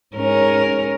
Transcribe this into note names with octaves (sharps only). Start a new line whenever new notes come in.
G#2 C#4 A#4